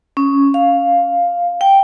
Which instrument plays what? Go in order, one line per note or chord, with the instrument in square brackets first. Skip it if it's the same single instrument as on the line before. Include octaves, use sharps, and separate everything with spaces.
[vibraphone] C#4
F5
G5